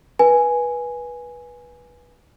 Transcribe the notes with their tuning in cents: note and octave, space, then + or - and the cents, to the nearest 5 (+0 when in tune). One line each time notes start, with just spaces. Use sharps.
B4 -20 G#5 +0